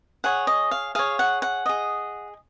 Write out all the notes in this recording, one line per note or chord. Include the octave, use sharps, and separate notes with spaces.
G#4 C#5 F#5
D#5
F5
G#4 C#5 F5
F#5
F#5
G#4 D#5